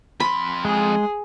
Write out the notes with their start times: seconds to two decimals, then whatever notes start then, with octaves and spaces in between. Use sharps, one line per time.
0.20 F2 B5 C6
0.65 G#3 G#4